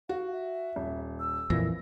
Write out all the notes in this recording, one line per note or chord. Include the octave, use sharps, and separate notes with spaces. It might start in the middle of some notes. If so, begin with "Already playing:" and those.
F#4 F5
E5
D#1
E6
F2 A#2 E3 A#6